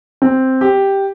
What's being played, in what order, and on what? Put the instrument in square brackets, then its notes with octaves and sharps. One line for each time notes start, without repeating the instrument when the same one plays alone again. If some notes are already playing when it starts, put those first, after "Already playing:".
[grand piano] C4
G4